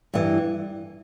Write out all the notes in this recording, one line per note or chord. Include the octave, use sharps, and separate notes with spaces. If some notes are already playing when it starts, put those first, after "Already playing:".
G2 E3